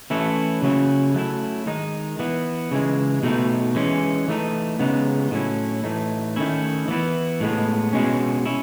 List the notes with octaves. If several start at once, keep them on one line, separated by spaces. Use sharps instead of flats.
E3 A3 C#4 E4
C#3 F#3 C#4 E4
F#3 A3 C#4 E4
D#3 G#3 D#4
E3 B3 E4
C#3 E3 G#3
B2 A3 D#4
E3 G#3 C#4
E3 A3 D#4
C#3 G#3 B3 D#4
A2 F#3 C#4 E4
A2 E3 A3 D#4
D#3 A3 C#4 E4
E3 B3 E4
A2 G#3 B3
B2 G#3 C#4
C#4 E4